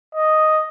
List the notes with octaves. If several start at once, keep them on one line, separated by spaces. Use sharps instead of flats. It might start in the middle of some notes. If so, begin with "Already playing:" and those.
D#5